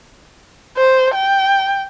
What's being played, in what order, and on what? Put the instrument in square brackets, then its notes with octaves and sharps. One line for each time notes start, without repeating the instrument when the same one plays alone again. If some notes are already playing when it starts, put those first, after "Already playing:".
[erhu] C5
G5